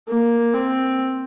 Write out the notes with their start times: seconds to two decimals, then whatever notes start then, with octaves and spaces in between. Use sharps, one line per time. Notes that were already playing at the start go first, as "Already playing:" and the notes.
0.08 A#3
0.54 C4